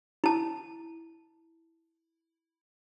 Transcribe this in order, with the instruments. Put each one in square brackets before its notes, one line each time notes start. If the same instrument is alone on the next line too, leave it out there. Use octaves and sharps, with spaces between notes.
[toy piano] E4 A5